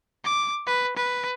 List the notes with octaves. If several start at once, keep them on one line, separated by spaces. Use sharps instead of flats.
D6
B4
B4